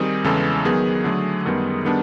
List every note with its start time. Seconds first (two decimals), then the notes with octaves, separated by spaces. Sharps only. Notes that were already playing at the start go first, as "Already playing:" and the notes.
Already playing: D#3 G3 C4 D#4 G#4
0.24 E2 C#3 E3 G#3 A4
0.65 D#3 F#3 B3 G#4
1.04 D3 F#3 A3
1.45 F#2 D#3 G3 B3
1.85 D#3 G3 B3 D4